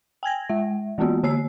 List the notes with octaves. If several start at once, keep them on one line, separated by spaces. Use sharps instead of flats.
G5 G#5 G#6 A#6
G#3 E5
E3 G#3 A#3 B3 F4 F#4
D3 A#3 C#5 E6 C7